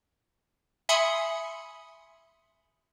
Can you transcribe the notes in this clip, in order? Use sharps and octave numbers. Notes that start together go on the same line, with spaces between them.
E5 G#5 B5 C6 D#6 C#7